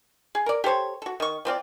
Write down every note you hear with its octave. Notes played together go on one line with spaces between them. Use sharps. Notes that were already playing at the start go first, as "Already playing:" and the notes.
G#4
A#4 D5
G4 A4 C5 C#5
F#4 A4
D#3 C#6
F3 C4 F4 D5